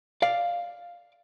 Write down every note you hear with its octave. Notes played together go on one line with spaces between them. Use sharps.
D5 F5